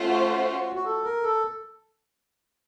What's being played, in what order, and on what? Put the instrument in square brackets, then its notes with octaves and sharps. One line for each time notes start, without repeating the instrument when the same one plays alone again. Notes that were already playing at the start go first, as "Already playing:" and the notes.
Already playing: [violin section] A3 C#4 F4 C5 F#5
[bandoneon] F#4
F#4
A4
A#4
A4